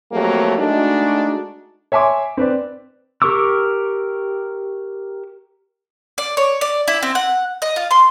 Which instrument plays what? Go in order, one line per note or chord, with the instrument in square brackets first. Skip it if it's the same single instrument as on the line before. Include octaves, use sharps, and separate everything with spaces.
[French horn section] F2 F#3 A3 A#3 G4
G#3 A3 D4 D#4 F#4
[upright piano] C#5 E5 G#5 C6 D6
C4 B4 D5
[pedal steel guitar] G4 A#4 C#6 D6 E6
[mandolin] D5
C#5
D5
E4
C4
F#5
D#5
F4
C6